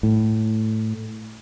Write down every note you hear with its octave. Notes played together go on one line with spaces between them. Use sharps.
A2